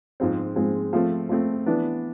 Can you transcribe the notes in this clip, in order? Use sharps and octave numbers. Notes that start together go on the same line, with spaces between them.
G#2 F3 G#3 C4
G#2 F3 G#3 C4
F3 A3 C4
F3 A3 C4
E3 B3 D4